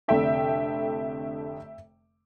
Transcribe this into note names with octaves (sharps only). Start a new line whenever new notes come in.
F1 F2 D3 A3 D4 E5 G5